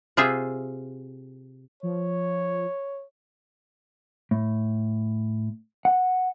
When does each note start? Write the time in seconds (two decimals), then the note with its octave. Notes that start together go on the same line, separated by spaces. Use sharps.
0.17 C3 F4 G#4 C5 E5
1.83 F3 C#5
4.31 A2
5.85 F#5